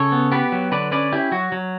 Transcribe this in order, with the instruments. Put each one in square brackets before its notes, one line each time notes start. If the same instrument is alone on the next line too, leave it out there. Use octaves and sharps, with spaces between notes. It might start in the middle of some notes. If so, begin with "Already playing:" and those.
Already playing: [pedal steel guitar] C#3 A4 C#5
B3
B3 G4 B4
F#3
D3 B4 D5
C#4 B4 D5
C#4 E4 G4
F#3 F#4
F#3